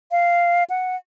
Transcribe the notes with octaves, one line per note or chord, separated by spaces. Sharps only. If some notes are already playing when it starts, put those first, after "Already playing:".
F5
F#5